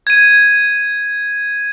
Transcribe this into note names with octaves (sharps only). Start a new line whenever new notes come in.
G#6 D#7